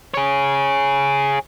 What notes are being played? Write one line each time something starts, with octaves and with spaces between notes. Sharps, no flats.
G#4 C#5